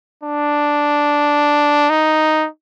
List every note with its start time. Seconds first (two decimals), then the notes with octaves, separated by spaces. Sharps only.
0.23 D4
1.90 D#4